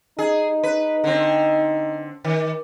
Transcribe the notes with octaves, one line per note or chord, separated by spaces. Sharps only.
D#4 G#4
B4
D3 C4
D#3